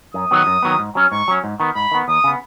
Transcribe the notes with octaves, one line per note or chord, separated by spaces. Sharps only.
F#2 D#6
D#3 F#3 B3
F#2
D#3 F#3 B3
G#2
F#3 C#4
G#2 C#6
F#3 C#4
G#2
D#3 B3
G#2 B5
D#3 B3
D#2 D#6
C#3 B3